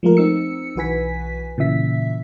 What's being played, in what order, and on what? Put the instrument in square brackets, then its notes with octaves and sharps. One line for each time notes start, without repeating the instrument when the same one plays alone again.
[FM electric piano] F3 G#3 A3 F4 A#4
C4 D#4 E6 C#7
B1 E3 F#4 B4 G#5 B6
A#2 C#3 E3 E5 B6